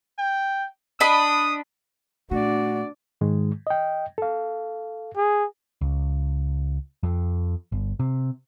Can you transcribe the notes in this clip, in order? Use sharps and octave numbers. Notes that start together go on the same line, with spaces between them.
G5
D4 D#5 B5 D#6
A#2 A3 D4 F#4 D5
G#2 D#3 G#3
D#5 G5
A4 F5
G#4
C#2
F2
G1
C3